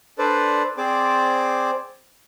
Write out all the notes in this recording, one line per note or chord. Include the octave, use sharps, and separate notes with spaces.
D4 A4 B4 C5 D5
C4 G#4 C5 D5 D6